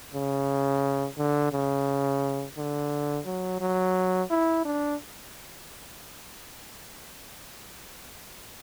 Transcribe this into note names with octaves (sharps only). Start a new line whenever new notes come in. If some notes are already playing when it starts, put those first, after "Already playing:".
C#3
D3
C#3
D3
F#3
F#3
E4
D4